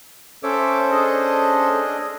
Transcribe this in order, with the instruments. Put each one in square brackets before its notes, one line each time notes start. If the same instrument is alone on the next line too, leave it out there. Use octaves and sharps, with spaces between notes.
[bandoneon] C#4 A4 C5 [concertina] C#5 E5 D6
[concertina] D4 G#4 D#5